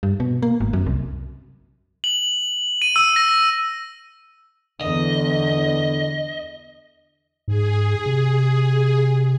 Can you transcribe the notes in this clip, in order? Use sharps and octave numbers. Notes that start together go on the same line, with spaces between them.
G2
B2
A#3
G#1
F#2
C2
F#7
D#7
E6
A#6
E2 D3 D#5
G#2 G#4
C3